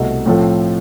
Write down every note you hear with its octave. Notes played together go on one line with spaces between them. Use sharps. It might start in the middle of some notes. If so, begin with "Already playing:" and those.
Already playing: C2 B2 A3
A2 F3 C4 F4 A4